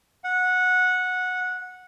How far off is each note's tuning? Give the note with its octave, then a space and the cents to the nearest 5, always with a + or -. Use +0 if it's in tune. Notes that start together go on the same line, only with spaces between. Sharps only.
F#5 -15